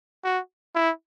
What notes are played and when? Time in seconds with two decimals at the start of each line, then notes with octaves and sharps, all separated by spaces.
0.24 F#4
0.75 E4